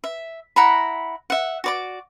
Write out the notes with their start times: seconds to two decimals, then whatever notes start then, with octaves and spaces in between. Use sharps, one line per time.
0.04 E5
0.56 E4 F#5 A#5 B5
1.30 E5 F#5
1.64 F#4 D5 D6